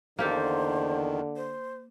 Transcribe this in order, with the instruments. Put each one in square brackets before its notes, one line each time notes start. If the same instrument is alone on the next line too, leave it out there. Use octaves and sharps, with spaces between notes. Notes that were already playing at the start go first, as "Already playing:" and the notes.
[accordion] E2 D#3 [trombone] D3 [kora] A#3 G4 A4 [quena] C5
[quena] C5